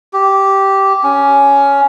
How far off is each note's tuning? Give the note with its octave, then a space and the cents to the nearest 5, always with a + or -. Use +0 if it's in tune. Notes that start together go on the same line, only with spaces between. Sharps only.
G4 -10
C#4 +10